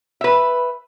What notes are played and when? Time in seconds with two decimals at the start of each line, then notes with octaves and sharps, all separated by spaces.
0.21 B4 E5